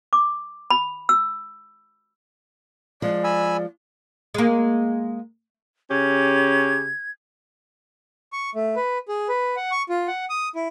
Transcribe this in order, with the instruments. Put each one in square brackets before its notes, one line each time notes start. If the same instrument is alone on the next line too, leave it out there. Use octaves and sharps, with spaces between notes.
[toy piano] D6
B5
E6
[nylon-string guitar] F3 G#3 [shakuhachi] D5
[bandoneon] G#5 B5 E6
[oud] G#3 A#3
[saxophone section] C#3 C#4 G4 [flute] G#6
[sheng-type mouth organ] C#6
A3
B4
G#4
B4
F#5
C#6
F4
F#5
D#6
E4